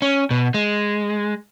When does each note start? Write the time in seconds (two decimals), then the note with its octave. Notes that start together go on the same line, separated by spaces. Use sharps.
0.02 C#4
0.31 B2
0.54 G#3